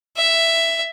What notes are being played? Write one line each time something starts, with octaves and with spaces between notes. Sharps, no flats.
E5